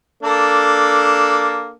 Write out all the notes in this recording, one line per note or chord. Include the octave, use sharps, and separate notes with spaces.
A#3 D4 A4